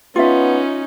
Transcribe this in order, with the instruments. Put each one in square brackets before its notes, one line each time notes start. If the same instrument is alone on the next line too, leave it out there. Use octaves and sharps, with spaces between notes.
[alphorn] B3 [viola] C#4 D#4 [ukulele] F4 E5